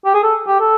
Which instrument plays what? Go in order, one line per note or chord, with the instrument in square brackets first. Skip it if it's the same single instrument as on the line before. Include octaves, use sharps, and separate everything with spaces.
[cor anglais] G4
G#4
A4
G4
A4